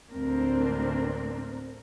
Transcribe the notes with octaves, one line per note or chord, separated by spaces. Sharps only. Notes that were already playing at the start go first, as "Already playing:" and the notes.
D2 A2 C4 D4 A#4